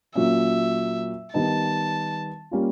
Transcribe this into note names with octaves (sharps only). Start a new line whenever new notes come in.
A#2 F#3 A#3 C#4 E5
D#3 G3 B3 D#4 A5
G3 A#3 C#4 F4